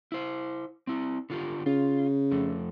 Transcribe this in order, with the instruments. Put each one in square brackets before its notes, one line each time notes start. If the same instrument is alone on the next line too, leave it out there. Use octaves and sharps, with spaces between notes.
[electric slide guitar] E4 C5
C4 E4
D3 F4 G4
[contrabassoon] C#3 [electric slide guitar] F4
[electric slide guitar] F2 A3